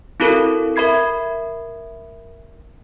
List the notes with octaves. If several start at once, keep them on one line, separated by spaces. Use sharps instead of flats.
C4 E4 F#4 A4 A#4
A#4 E5 B5 G#6 C7